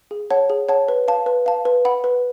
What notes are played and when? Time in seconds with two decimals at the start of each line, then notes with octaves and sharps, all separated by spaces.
0.11 G#4
0.31 C#5 F#5 A5
0.50 G#4
0.69 C#5 F#5 A5
0.88 B4
1.08 F5 A5
1.26 B4
1.46 F5 A5
1.65 B4
1.85 F#5 B5
2.04 B4